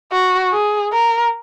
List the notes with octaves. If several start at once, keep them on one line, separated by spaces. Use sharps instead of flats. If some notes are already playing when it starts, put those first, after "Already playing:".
F#4
G#4
A#4